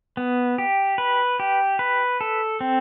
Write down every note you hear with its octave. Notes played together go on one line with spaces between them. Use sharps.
B3
G4
B4
G4
B4
A4
C4